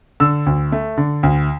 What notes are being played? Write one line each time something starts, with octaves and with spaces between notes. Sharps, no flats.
D3 E6
D2
A3
D3
D2